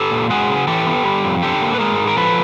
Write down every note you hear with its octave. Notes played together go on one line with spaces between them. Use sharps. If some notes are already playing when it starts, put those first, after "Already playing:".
Already playing: G4 A4
A#2
G#3 F#4 G#4
C#3
E3 G4 A4
B3
G3
F2
D3 G4 A4
A#3
B4
G#3 G#4 A#4
G#2
A#4
F3 A4 B4